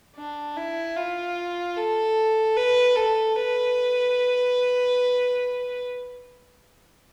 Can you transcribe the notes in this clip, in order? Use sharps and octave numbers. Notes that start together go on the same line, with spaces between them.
D4
E4
F4
A4
B4
A4
B4